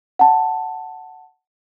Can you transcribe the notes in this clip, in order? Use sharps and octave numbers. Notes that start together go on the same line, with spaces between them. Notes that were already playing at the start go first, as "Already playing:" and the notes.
F#5 A5